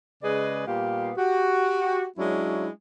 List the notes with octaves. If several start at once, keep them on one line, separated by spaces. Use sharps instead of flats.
C#3 G#3 G#4 B4 D5 D#5
A#2 G3 B3 G4 F5
F#4 G4
F#3 G#3 C#4 D4 E4